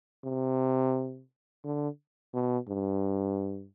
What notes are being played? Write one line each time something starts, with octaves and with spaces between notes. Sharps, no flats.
C3
D3
B2
G2